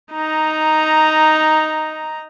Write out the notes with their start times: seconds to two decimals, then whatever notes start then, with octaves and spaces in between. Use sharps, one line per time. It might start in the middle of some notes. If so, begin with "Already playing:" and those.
0.13 D#4 A#5